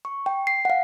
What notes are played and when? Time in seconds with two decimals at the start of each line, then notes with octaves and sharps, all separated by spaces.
0.05 C#6
0.26 G5
0.47 C7
0.65 F5 F#5